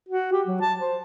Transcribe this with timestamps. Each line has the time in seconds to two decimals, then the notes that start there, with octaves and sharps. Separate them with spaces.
0.08 F#4
0.32 G4
0.47 F#3
0.61 A5
0.80 C5